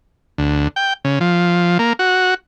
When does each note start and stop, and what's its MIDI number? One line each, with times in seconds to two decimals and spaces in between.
0.38 0.68 38
0.76 0.93 79
1.05 1.19 49
1.21 1.78 53
1.79 1.93 58
1.99 2.34 66